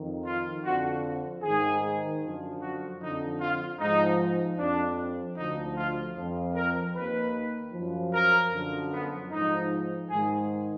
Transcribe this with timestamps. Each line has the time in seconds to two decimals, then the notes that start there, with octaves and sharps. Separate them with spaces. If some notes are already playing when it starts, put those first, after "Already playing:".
Already playing: F2 D#3
0.26 F4
0.64 F2 D3 F3 F#4
1.43 G#2 D#3 G#4
2.22 F#2 D3 F3
2.61 F#4
3.00 F2 D3 F3 D#4
3.40 F4
3.80 G#2 F3 D#4
4.59 F2 F3 D4
5.37 D2 D3 F3 D#4
5.76 F4
6.16 F2 F3
6.56 A#4
6.95 D#2 D#3 B4
7.73 F#2 F3
8.14 A#4
8.52 F#2 D3 F3
8.92 B3
9.31 G#2 F3 D#4
10.10 G#2 D#3 G#4